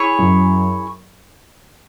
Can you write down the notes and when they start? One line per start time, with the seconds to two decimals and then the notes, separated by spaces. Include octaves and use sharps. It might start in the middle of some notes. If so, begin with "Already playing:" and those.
Already playing: E4 G#4 C#5
0.19 F#2